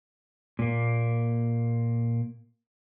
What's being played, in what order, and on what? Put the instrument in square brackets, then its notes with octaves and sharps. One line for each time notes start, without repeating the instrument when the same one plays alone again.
[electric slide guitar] A#2 A#3